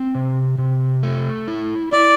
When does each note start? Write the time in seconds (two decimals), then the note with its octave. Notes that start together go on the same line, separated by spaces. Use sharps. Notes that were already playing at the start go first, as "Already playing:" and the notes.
Already playing: C4
0.15 C3
0.58 C3
1.03 A3
1.48 E4
1.93 E4 D5